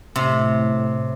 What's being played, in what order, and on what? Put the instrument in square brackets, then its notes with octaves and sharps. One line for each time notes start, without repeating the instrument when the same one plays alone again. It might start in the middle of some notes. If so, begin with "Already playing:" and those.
[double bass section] A2 [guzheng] C3